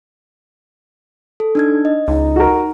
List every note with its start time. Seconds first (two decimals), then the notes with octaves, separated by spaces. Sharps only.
1.40 A4
1.55 D4 D#4 G#6
1.85 D#5
2.08 C#2 D#4
2.36 F#4 A#4